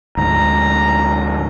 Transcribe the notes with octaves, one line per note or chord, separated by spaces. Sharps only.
D2 G#2 A#5